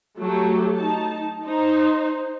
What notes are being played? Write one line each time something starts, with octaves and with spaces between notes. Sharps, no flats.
F#3 A3 G4 A4
D#4 A5
D#4 C5